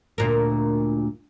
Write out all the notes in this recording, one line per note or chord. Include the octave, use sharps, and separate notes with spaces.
D2 A#2 A#4